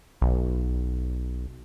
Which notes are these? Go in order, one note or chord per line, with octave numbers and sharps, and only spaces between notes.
B1